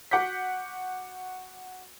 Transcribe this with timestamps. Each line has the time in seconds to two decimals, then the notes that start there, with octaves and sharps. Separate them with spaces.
0.11 F#4 F#5 D6 G6 B6